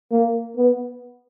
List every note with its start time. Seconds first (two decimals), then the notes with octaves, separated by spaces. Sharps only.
0.11 A#3
0.57 B3